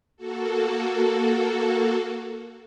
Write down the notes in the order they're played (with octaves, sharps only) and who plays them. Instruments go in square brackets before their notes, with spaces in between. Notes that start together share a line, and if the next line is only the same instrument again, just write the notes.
[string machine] A#3 F#4 A4